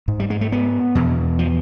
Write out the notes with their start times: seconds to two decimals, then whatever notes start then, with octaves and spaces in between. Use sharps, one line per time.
0.08 G#2
0.20 G3
0.30 G#3
0.41 A3
0.52 B3
0.95 E2 B2
1.39 F3